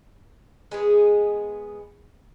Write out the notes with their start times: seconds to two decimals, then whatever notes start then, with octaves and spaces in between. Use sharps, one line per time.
0.71 G#3 B3 G#4